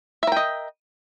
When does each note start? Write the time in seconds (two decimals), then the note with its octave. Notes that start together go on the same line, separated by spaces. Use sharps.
0.23 E5
0.27 A#4
0.32 G5
0.37 D#5